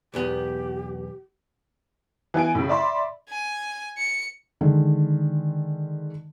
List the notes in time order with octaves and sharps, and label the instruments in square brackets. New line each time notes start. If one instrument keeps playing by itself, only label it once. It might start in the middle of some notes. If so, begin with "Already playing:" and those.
[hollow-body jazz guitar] B1 E2 B3 [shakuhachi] G4
[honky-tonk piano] E3 B3 G#5 D7
A2 C#3
D5 E5 B5 C6
[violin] G#5
C#7
[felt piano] D3 D#3 G#3